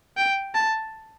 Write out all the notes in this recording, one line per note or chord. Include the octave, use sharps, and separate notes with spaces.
G5
A5